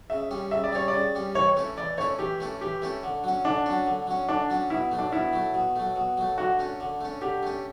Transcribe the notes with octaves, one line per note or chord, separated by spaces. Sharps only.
C#3 E5
G3 C#4
C#3 E5
D5
G3 C#4 C#5
D5
C#3
G3 C#4
E3 C#5
A3 C#4 E4
E3 D5
A3 C#4 E4 C#5
E3 G4
A3 C#4 E4
E3 G4
A3 C#4 E4
D3
F#3 C#4
D3 D4
F#3 C#4
D3
F#3 C#4
D3 D4
F#3 C#4
B2 E4
F#3 A3
D4
B2 E4
F#3 A3
B2
F#3 A3
B2
F#3 A3
D3 F#4
A3 C#4
D3
A3 C#4
D3 G4
A3 C#4